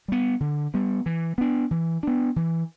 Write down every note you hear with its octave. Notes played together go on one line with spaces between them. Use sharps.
G3 B3
D3
G3 B3
E3
B3 D4
E3
B3 D4
E3